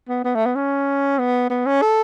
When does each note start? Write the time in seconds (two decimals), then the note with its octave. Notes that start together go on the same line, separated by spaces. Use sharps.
0.09 B3
0.24 B3
0.35 A3
0.46 B3
0.56 C#4
1.19 B3
1.50 B3
1.66 C#4
1.82 A4